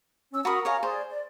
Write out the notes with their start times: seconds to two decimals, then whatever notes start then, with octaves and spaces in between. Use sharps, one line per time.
0.33 C#4 E6
0.45 F#4 A#4 A#5 B5 C#6 D#6
0.65 C#5 D#5 F5 G#5 A#5
0.83 G#4 C5 D5
1.10 D5